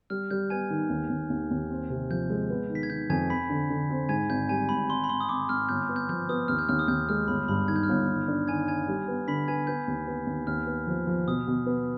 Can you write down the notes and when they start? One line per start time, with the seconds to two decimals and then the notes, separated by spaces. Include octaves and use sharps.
0.10 G3 F6
0.31 G3 G6
0.50 B3 G#5 G#6
0.70 D#3
0.90 D#2
1.10 D#2
1.30 D#2
1.51 D#2
1.70 C4
1.90 C3
2.10 F3 G6
2.30 G#3
2.50 B3
2.70 D#3
2.75 B6
2.83 G#6
2.90 D#3 G6
3.10 F2 G#5 G#6
3.30 C4 B5 B6
3.49 D3
3.70 D3
3.90 C4
4.09 G#2 G#5 G#6
4.29 G#1 G6
4.49 G3 G#5
4.69 G#1 B5
4.89 G#1 C6
5.04 B5
5.09 G#1 C6
5.20 D#6
5.29 G#1 D6
5.49 G#1 F6
5.69 G1 G6
5.89 B3
5.96 G6
6.09 F3 G6
6.29 B3 D#6
6.48 D#2 F6
6.59 G6
6.69 D#2 F6
6.79 D#6
6.88 D#2 G6
7.09 G#3 F6
7.28 G1 B5
7.48 G2 B5
7.68 D#3 G#6
7.76 G6
7.83 F6
7.89 G1 G6
8.08 D#3
8.28 D4
8.47 D#3 G#5 G#6
8.67 D#3 G#5 G#6
8.88 G3
9.08 B3
9.28 D3 B5 B6
9.48 B3 G#5 G#6
9.67 B3 G6
9.88 D#2
10.07 B3
10.27 D#2
10.47 D#2 F6
10.67 B3
10.87 F3
11.07 F3
11.28 B2 D#6
11.47 B2
11.66 B3